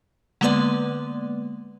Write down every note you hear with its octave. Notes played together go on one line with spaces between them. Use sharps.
D3 G#3 A#3 B3 B4 D5